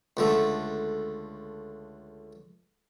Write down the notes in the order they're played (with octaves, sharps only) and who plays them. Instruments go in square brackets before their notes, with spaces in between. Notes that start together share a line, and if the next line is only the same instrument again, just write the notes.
[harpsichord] C#2 D3 A3